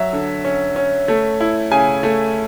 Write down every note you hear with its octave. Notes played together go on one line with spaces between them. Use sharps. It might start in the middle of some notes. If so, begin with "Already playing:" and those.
Already playing: F#3 E5
D3
C#4
C#4
A3
E4
C#3 G#5
A3